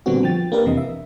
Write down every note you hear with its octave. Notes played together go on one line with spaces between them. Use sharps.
A#2 D3 G3 B3 C4 F#4
F3 G5 A6
A#3 D4 G4 A#4 B4
E2 C3 E3 D#5
E5